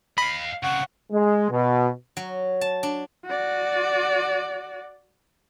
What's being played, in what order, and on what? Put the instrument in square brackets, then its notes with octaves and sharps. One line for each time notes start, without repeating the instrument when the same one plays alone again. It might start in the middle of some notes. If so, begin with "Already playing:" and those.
[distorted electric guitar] D#5 F5 [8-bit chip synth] B5
[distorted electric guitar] C#3 C4 [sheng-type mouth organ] F#5 C#6
[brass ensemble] G#3
B2
[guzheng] F#3
A5
D4
[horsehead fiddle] F#4 D5